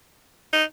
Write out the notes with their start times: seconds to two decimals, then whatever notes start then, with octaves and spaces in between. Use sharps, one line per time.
0.53 D#4